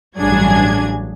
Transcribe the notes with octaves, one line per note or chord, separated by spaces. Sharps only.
A1 G2 F#3 D4 G#4 G#6